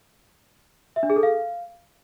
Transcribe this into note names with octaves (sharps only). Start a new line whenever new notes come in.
E5
D4
G#4
A4
F5